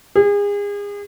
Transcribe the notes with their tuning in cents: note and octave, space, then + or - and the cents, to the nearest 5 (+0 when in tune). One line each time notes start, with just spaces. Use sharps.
G#4 -35